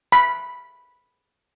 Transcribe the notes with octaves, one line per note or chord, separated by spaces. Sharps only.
B5